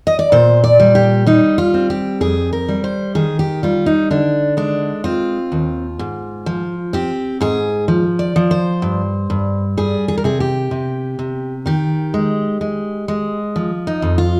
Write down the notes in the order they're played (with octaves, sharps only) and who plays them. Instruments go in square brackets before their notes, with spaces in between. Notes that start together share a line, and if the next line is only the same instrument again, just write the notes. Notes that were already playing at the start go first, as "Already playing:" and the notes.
[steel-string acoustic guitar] D#5
D5
A#2 C5
D5
G3
G4
G3 D#4
F4
C4
G4
F2 G#4
A#4
G3
C5
D#3 G#4
G4
G3 F4
D#4
D3 D4
G#3 D4
C4 F4
D#2
G#2
F3
C4 G4
G#2 G#4
F3
D5
F3
C5
G2
G2
G3 G#4
G#4
A#4
C3 G#4
G4
C3
C3
D#3 G4
G#3
G#3
G#3
F3
D#4
F2
F4